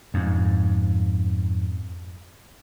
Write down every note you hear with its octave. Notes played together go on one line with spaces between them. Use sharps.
F2 G#2